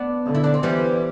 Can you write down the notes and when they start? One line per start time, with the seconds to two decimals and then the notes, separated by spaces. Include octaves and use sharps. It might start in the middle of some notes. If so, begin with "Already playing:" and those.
Already playing: B3 D4
0.26 D3
0.35 E4
0.44 D4
0.54 C4
0.63 E3 G3 B3